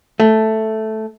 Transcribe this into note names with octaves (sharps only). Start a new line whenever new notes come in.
A3